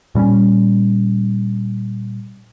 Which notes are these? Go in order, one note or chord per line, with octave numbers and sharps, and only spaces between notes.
A#2 G3 C4 C#4